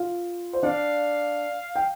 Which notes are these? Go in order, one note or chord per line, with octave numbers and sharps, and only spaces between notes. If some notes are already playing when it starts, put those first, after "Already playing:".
Already playing: F4 F5
C5
D4 D5 F5
G5